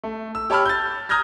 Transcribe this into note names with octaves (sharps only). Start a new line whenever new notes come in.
A3
E6
G4 C#5 A5 B5 E6 F6
G6 A6
A#5 D#6 F6 G6 G#6 A#6